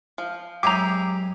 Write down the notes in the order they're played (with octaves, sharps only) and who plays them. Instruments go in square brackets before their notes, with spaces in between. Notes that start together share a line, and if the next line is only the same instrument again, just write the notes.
[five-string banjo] F3
[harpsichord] F#2 G#3 C4 [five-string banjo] E4 G4 G#4 [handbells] A#5 D6